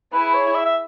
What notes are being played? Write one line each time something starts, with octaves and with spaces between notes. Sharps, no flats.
E4 G#4 B4
C#5
E5
E5